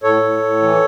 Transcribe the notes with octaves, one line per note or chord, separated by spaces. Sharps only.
A2 A4 C#5
A2
A2
E3